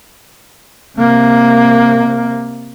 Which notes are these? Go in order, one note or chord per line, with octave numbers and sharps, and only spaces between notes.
C3 A#3